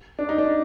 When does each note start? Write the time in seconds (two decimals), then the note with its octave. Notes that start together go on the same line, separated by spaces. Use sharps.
0.19 D4
0.29 D#4
0.38 D4